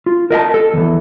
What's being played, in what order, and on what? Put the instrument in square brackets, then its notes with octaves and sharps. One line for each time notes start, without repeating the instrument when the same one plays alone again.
[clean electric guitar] F4
A#4 D#5 E5 A5
A4
E2 E3